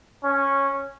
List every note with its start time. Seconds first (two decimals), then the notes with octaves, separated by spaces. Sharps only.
0.24 C#4